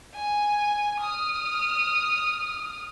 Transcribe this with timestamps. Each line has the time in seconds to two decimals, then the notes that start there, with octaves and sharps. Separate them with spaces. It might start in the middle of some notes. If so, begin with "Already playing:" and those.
0.15 G#5
1.00 D#6 F6